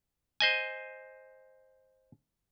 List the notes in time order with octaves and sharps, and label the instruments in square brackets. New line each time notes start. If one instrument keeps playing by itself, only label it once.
[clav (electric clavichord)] C5 D#5 G#5